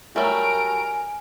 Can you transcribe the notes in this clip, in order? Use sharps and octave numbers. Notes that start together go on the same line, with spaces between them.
F#3 G3 A3 A#4 G#5 D7